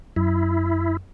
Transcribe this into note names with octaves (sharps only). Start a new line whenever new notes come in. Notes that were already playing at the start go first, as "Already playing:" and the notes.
F#2 E4